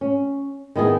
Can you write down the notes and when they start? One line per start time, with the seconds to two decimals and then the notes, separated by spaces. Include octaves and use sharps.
0.01 C#4
0.76 D#3 B3 E4 G#4